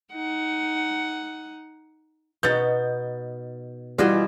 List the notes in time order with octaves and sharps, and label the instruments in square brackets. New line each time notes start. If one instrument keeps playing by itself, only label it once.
[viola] D#4 F#5
[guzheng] B2 B3 D#4 [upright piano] G6 A6
[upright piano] E3 G3 F#4 [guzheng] F4 G#4 D#5